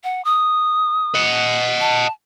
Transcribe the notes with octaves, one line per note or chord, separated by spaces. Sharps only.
F#5
D#6
D#5 F#5
A5